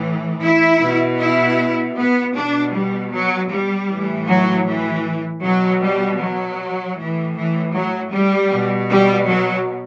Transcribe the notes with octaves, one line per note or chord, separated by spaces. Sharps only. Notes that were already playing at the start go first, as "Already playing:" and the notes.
Already playing: A2 E3
E4
B2
E4
B3
B2 D4
G3
F#3
G3
A2 E3
F#3
E3
B2 F#3
G3
F#3
A2 E3
E3
F#3
G3
B2
G3
F#3